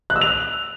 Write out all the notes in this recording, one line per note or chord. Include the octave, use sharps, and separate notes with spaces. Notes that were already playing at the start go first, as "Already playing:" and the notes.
F#6
E6
F7